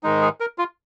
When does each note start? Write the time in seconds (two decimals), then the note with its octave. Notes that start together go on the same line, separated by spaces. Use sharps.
0.03 G#2 D#3 G#3 D#4
0.22 G#4
0.40 A#4
0.58 F4